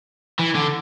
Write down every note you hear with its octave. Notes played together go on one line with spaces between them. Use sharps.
E3
D3